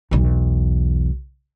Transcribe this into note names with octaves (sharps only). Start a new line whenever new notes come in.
B1 E2